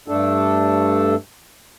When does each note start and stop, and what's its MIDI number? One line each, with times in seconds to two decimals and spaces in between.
0.08 1.15 43
0.08 1.15 57
0.08 1.15 62
0.08 1.15 69